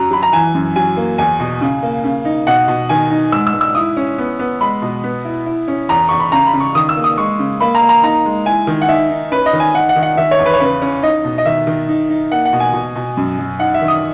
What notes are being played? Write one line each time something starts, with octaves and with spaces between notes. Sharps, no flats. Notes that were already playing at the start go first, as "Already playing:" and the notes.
Already playing: F#2 F#3 A#5
F#3 B5
A#5
E3 G#5
F#2
F#3 G#5
A#3
E2 G#5
B2
C#3
A#3
C#3
D#4
B2 F#5
B2
D#3 G#5
D#4
G#2 E6
E6
G#2
E6
E4 D#6
C#4
B3
B3
G#3 B5
B2
B3
E4
E4
C#4
E2 A#5
E2 C#6
B5
C#3 A#5
B5
C#3
C#6
D#3 D#6
E6
A#3
D#6
G#3 C#6
C#3
A#3 B5
A#5
A#3
A#5
D#4 A#5
G#3
E4 G#5
D#3
F#5
D#4 E5
D#4
C#4 B4
D#5
D#3
G#5
D#4 F#5
F#5
D#3
F#5
D#3 E5
C#5
E2
B4
C#5
C#3 B4
C#4
D#4 D#5
B2
D#5
D#3 E5
D#3
D#4
D#4
A#3 F#5
F#5
B2
G#5
B2
B2
F#2
F#2
D#4 F#5
E5
D#3
D#6